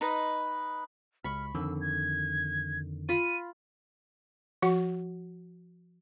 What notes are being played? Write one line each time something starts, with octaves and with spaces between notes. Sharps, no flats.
D#4 B4 D#5
C#2 B5 C#6 F6
F2 D3 D#3 E6
G#6
F4 B5 D#7
F3 F#4 F#5